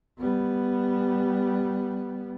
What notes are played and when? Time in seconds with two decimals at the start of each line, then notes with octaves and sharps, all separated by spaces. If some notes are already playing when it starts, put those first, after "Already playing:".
0.18 G3 B3